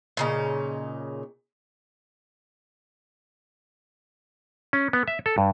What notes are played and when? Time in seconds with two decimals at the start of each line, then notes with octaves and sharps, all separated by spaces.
0.17 A#2 C#3 D#4
4.73 C#4
4.93 B3
5.08 E5
5.26 A4
5.38 G2